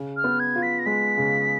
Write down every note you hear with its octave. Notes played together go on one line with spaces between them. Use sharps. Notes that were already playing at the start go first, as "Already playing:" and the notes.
Already playing: C#3
F6
B3
G#6
F4
B6
A#6
G#3 B6
C#3